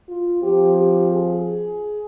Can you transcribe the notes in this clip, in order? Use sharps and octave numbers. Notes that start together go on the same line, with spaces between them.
F4
F3 C4 G4
G4
G#4